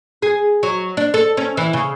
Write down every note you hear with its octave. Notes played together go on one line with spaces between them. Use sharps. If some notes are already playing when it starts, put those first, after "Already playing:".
G#4
F#3
D4
A4
C#4
E3
C#3